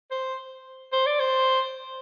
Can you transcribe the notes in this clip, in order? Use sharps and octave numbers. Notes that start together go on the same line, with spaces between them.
C5
C5
D5
C5